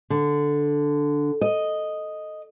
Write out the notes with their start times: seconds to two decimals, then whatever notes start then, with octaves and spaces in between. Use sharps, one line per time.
0.10 D3
1.41 D#5